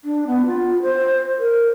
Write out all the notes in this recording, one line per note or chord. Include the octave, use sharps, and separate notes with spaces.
D4
B3
F4
C5
A#4